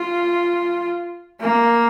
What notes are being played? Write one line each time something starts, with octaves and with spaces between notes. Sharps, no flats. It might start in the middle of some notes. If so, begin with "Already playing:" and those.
Already playing: F4
A#3